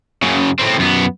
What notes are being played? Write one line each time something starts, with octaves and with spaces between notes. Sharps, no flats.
F#2 C#3
A2 C4
F#2 B3